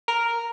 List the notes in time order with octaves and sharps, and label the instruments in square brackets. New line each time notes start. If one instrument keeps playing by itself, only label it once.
[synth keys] A#4